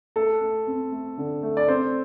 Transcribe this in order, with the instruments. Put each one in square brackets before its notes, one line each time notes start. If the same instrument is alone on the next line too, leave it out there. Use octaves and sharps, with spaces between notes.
[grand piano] A3 A4
A3
C4
A3
D3
A3
D5
C4 C5